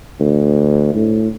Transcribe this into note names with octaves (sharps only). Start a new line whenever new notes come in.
D2
A2